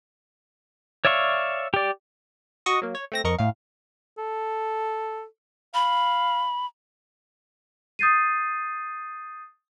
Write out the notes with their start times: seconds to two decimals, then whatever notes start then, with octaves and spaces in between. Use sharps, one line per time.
1.05 C#5 D5 E5 F5 C#6
1.74 G4 D5
2.66 F#4 D#5 C#6 D#6
2.82 F#3 A#3
2.95 C#5
3.12 A3 C4 A#6
3.24 F2 A#4 D#5 C#6
3.38 A2 F5
4.18 A4
5.74 F5 B5
7.99 D#6 G6 A6 C7 D#7